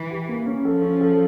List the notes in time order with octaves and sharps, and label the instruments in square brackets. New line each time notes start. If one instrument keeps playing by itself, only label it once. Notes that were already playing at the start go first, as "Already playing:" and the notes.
Already playing: [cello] E3
[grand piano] G4
A#3
C#4
[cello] F3 [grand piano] A4
[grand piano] C#4
A4